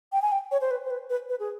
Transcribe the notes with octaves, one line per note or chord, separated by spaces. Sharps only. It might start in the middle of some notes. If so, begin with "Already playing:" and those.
G5
G#5
G5
C#5
C5
B4
C5
B4
B4
B4
G#4